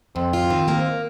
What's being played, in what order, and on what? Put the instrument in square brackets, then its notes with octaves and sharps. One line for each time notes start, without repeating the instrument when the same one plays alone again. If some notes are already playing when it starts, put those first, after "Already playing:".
[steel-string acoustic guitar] F2 [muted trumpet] C4
[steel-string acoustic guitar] F4
D#3
A#3